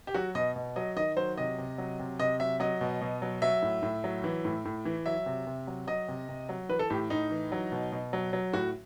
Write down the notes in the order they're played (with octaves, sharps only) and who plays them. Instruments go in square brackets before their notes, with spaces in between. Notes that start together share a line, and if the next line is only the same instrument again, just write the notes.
[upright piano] G4
F#3 F#4
B2 D#5
B2
F#3 D#5
D#3 D#5
F#3 C5
C3 D#5
C3
F#3
C3
C3 D#5
F#3 E5
F#3 D#5
B2
B2
F#3
F#3 E5
A2
A2
F#3
E3
A2
A2
E3
F#3 E5
C3
C3
F#3
F#3 D#5
C3
C3
F#3
E3 B4
A4
A2 G4
A2 D#4
E3
F#3
B2
B2
F#3
F#3
A2 F#4